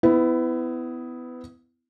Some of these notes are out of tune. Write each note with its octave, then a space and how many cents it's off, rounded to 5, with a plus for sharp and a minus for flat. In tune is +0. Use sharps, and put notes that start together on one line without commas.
B3 +25 E4 +0